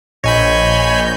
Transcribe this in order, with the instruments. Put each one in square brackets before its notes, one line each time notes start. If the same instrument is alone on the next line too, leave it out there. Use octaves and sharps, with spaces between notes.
[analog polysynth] A#1 G6 [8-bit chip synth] C#5 G#5 B5 [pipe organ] D#5